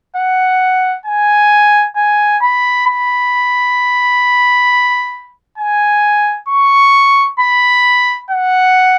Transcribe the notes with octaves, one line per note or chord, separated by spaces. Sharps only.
F#5
G#5
G#5
B5
B5
G#5
C#6
B5
F#5